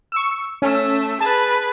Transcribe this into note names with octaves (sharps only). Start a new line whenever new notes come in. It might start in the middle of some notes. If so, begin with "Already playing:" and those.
C#6 E6
A3 C#4 E6
G#4 B4 A5